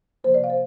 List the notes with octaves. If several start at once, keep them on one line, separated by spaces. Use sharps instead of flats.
C3 F3 A#3 C5
D5
F5
C5